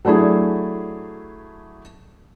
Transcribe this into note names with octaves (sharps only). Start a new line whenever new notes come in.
F#3 A3 D4 E4 G#4